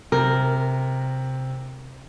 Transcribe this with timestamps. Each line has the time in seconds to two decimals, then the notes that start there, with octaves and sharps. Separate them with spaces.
0.12 C3 A#4